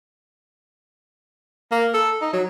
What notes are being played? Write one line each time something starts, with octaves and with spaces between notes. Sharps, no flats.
A#3
A4
D#4
F#3